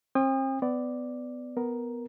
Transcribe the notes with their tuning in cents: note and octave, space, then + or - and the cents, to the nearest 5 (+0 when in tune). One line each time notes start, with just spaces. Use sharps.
C4 +35 G5 +40 D#6 -25
B3 +25 D5 +0
B3 +0 A#4 +5